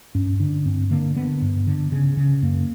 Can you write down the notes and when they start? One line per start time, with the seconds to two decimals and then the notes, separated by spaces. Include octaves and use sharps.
0.15 G2 C#4
0.40 D3 D4
0.66 G2 C4
0.91 D3 A#3
1.16 D3 B3
1.42 G2
1.67 D3
1.92 C#3
2.17 C#3
2.42 F#2 A#3